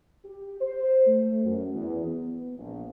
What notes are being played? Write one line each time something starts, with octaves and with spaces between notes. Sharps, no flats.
G4
C5
A3
F#2
E2
B3
A#1